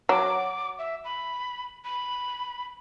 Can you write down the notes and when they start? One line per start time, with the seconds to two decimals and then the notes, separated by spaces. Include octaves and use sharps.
0.09 F#3 D6
0.79 E5
1.05 B5
1.85 B5